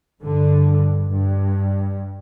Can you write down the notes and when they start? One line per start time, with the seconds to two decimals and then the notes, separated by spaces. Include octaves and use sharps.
0.22 G2 D3
1.11 G2